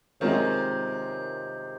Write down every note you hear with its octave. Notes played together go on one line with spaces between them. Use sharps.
C3 D#3 G#3 C4 F4 A#4 C#5